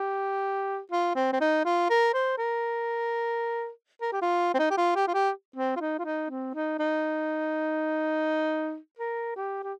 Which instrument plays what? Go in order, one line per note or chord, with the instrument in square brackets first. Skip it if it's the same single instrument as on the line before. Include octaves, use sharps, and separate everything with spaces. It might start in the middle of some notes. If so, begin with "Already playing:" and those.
Already playing: [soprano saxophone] G4
F4
C4
C4
D#4
F4
A#4
C5
A#4
A#4
G4
F4
C4
D#4
G4
F4
G4
F4
G4
C4
F4
D#4
F4
D#4
C4
D#4
D#4
A#4
G4
G4